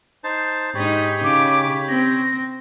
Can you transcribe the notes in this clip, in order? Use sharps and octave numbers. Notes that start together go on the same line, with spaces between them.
D#4 C5 A5
G#2 D#4 G4 C#5 B5
C#3 D6
C4 A#6